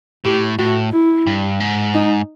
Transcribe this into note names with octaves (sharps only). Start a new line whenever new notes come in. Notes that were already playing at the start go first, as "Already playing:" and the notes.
A2 G4
A2 F#4
E4
G2
G#2
D#4